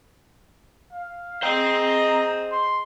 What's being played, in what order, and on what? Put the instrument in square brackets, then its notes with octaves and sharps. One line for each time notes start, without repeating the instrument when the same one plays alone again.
[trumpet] F5
[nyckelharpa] G#4 D#5 [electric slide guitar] C5 G5 [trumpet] A#5
[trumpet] C6